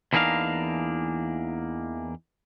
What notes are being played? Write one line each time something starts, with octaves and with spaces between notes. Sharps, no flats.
E2 E3 A#3 D4 D#4 F5